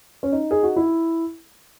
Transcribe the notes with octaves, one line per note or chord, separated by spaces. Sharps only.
C#4
D#4
G#4
F#4
E4